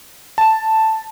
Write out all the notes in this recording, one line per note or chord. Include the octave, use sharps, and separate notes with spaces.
A5